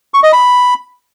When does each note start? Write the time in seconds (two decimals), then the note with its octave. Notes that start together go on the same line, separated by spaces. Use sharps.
0.14 C#6
0.23 D#5
0.33 B5